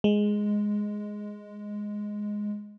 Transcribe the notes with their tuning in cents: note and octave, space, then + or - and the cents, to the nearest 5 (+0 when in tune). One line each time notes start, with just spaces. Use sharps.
G#3 +0